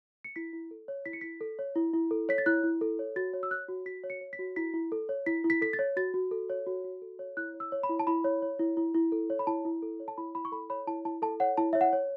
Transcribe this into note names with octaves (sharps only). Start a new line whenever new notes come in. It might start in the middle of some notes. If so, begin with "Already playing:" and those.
C#7
E4 B6
E4
A4
C#5
E4 B6
C#7
E4 B6
A4
C#5
E4
E4
A4
C#5 B6
A6
E4 F#6
E4
A4
C#5
F#4 A6
C#5
E6
C#5 F#6
F#4
F#4 B6
C#5
C#7
C#5
B6
F#4
E4 B6
E4
A4
C#5
E4 B6
E4
B6
A4 B6
A6
C#5
F#4 A6
F#4
A4
C#5
F#4
F#4
A4
C#5
E4 F#6
C#5
E6
C#5
B5
E4
A5
E4 B5
C#5
C#5
E4
E4
E4
A4
C#5
B5
E4 A5
E4
A4
C#5
A5
E4 B5
E4 B5
C#6
A4 B5
C#5 B5
E4 A5
E4 A5
A4 A5
C#5 F#5
E4 A5
C#5 E5
F#5
C#5